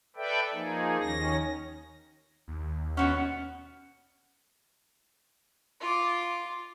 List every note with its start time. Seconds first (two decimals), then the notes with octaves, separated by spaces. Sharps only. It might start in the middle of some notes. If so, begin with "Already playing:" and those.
0.16 A4 B4 D5 E5 G5
0.53 F3 A#3 D#4 G#4
1.00 D#2 D#3 C#4 A#6
2.48 D#2
2.97 B2 C4 C#4 F#5
5.81 F4 D6